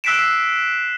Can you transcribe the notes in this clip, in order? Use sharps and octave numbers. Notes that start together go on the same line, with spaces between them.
E6 F#6 B6 C7 D7 E7